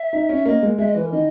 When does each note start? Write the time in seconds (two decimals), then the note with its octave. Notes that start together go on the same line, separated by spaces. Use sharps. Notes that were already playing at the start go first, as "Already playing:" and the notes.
Already playing: E5
0.13 D#4
0.29 C#4
0.35 E5
0.46 A#3 D#5
0.63 G#3
0.78 G#3 E5
0.87 D#5
0.95 E3 B4
1.04 A#4
1.12 D#3 D#5